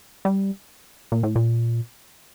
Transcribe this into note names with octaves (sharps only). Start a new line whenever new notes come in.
G3
A#2
A2
A#2